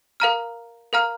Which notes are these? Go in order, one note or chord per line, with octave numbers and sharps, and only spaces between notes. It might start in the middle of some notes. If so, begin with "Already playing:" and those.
A#4 F5 A#5 F6
A#4 F5 A#5 F6